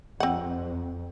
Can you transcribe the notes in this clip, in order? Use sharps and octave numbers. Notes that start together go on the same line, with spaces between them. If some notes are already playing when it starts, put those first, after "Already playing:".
F2 C4 F#5